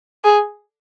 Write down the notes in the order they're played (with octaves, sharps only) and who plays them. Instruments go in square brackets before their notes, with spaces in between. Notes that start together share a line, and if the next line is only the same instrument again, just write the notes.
[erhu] G#4